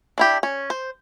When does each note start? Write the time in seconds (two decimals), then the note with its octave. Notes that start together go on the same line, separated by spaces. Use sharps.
0.18 D4 E4 G4
0.43 C#4
0.70 C5